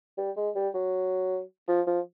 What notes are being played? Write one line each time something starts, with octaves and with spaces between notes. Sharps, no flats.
G3
G#3
G3
F#3
F3
F3